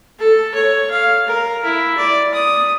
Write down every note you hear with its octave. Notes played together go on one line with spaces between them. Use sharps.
A4
C#5
F5
A#4
E4
D5
D#6